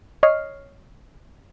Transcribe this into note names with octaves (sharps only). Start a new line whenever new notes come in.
C#5 D#5 F6 C7